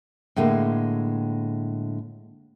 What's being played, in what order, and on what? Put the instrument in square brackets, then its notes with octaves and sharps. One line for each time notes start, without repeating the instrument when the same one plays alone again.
[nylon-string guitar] A2 D3 G#3 A#3